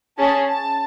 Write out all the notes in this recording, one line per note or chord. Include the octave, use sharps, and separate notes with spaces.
C#4 G#4 A5
A5